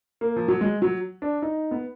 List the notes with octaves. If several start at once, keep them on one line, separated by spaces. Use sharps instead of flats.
A#3
F3
F#3
G#3
F#3
D4
D#4
B3